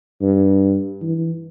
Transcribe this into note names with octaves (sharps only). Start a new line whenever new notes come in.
G2
E3